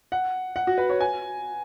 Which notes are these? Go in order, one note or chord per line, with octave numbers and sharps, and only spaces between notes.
F#5
F#5
F#4
B4
C#5
G#5